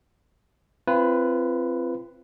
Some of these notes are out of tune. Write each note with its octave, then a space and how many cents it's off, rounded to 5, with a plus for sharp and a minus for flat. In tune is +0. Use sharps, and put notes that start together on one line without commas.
C4 +0 F4 -35 B4 +0